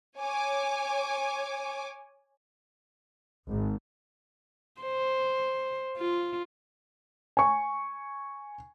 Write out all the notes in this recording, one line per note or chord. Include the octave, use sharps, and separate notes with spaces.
C#5 G#5 D6
G#1
C5
F4
G#5 C#6